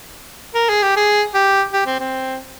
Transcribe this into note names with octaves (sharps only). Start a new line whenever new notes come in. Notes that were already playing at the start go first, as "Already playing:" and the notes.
A#4
G#4
G4
G#4
G4
G4
C4
C4